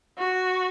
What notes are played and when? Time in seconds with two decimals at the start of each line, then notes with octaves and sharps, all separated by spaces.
0.18 F#4